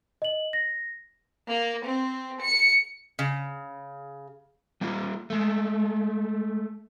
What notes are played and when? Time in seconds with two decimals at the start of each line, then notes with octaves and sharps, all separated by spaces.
0.22 D#5 F#7
0.53 A#6
1.49 A#3
1.86 C4
2.43 C#7
3.19 C#3
4.81 G3 A#3 F4
5.30 G#3 A3